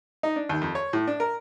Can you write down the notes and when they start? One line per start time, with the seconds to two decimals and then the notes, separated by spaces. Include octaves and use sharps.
0.23 D#4
0.36 D4
0.49 D#2
0.61 F2
0.75 C#5
0.93 A2
1.07 D4
1.20 A#4